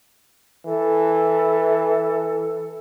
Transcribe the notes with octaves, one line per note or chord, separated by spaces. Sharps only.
E3 A4